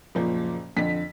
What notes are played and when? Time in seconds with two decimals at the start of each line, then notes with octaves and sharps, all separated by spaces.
0.15 F#1 A#2 F3
0.77 F2 D3 B6